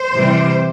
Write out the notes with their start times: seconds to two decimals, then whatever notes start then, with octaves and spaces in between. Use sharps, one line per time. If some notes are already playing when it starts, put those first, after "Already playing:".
Already playing: C5
0.13 C3 E3 G3